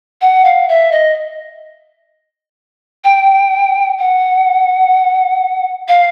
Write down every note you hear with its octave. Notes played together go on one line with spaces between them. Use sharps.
F#5
F5
E5
D#5
G5
F#5
F5